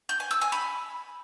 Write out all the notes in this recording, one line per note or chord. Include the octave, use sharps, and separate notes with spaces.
G6
G#5
E6
G#5
B5